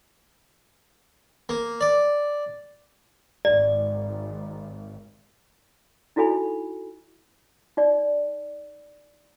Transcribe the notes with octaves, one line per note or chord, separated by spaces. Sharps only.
A#3
D5
G#1 D5
D#4 E4 F#4 A4 G#5 B5
D#4 D5